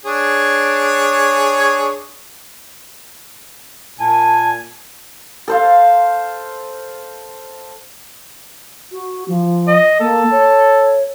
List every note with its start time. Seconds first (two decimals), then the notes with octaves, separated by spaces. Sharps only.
0.05 D4 G#4 C#5
4.00 A#2 G#5 A5
5.48 A4 C5 F5
8.91 F#4
9.28 F3
9.67 D#5
10.00 A#3 A4
10.31 C#5